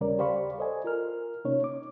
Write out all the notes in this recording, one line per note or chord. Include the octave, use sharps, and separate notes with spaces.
D#2 C#3 G3 C#4 A#4 D5
G4 C5 D5 F5 B5 C#6
A4 C5 D#5 G#5
F4 A#4 F6
C3 A#3 C#4 D#4 C#5
D6